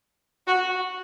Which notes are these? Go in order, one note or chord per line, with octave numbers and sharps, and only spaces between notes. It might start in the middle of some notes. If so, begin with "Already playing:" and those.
F#4